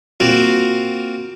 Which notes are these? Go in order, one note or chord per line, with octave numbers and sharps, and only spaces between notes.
A#3 C4 F4 F#4